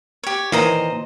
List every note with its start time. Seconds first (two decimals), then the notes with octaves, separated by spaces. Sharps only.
0.24 G4 C#5
0.52 A#2 D#3 E3 C5 D#5 A#5